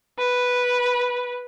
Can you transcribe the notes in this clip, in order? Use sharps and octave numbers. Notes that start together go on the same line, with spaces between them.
B4